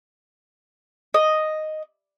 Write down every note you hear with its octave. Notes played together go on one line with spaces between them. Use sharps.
D#5